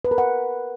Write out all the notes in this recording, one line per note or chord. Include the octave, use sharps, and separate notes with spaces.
B4
A#4
F#5